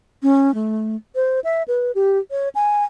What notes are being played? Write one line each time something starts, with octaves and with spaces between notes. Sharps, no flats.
C#4
A3
C5
E5
B4
G4
C#5
G#5